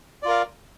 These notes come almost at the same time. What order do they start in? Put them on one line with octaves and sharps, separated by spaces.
D5 F4 A#4 F5